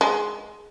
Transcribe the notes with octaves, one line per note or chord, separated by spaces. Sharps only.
G#3